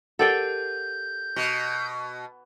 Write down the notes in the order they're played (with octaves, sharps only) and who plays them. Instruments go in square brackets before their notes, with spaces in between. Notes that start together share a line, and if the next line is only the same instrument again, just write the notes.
[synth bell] G4 A#4 F#5 [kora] A4 D5 G5 [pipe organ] G6
[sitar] B2